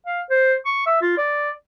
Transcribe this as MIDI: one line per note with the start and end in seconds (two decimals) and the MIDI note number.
0.06 0.21 77
0.30 0.55 72
0.66 0.83 85
0.86 0.99 76
1.02 1.17 65
1.18 1.51 74